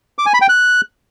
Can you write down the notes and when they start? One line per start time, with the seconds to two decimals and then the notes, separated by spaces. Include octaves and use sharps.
0.19 D6
0.26 G#5
0.34 B5
0.41 G5
0.49 F#6